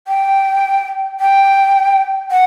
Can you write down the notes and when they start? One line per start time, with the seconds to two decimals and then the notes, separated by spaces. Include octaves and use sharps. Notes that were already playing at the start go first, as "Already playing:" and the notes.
0.08 G5
1.20 G5
2.31 F#5